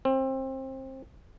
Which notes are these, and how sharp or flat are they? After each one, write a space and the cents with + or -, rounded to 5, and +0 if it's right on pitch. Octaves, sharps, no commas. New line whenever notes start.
C4 +25